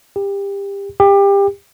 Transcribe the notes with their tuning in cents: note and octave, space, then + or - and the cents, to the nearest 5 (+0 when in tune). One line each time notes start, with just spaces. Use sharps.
G4 +25
G4 +25